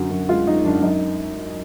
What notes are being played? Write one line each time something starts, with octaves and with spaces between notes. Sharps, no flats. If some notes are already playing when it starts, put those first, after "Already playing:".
Already playing: F#2 D3 F#4
F#2
G#3 F4
F#2 D#4
F#2 D4
F#2 D#4